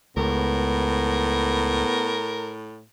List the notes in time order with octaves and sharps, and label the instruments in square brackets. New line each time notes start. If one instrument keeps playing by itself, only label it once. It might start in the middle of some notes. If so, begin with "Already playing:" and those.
[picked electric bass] C#2 [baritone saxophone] A2 [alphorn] B3 [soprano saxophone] A#4